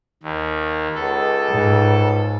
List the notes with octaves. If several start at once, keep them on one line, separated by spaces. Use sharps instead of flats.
D#2
C#2 A4
G#2